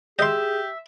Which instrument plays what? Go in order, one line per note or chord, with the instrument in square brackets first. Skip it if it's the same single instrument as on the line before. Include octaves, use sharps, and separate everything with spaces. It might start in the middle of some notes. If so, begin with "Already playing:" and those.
[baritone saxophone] G4 [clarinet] G#4 [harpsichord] D#5 C6 [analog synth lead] E5